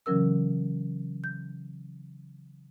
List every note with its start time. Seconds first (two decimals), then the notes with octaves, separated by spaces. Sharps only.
0.06 C#3 E3 F#3 C#4 A#4 E6
1.24 G6